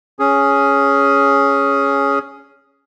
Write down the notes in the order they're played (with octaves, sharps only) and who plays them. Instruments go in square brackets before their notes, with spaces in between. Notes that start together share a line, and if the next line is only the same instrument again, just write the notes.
[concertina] C#4 G#4